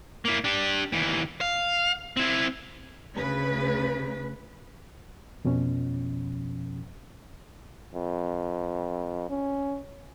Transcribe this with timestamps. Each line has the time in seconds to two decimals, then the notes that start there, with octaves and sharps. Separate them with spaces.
0.25 A#3 E4
0.44 D4 G4
0.92 D#2 E3
1.41 F5
2.17 C4 E4
3.17 D2 C#3 B4
5.45 F2 B2 F3 C#4
7.94 F2
9.29 C#4